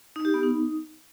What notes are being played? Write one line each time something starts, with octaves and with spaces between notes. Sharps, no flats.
D#4
G4
B3
D#4